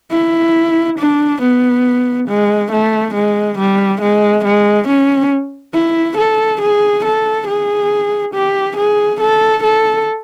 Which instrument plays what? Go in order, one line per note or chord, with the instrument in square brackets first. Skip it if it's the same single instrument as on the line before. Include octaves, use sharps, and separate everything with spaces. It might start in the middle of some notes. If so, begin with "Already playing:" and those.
[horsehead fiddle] E4
D4
B3
G#3
A3
G#3
G3
G#3
G#3
C#4
E4
A4
G#4
A4
G#4
G4
G#4
A4
A4